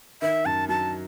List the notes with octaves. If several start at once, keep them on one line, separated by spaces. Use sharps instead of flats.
D#3 E5
F#2 A5
F#3 A5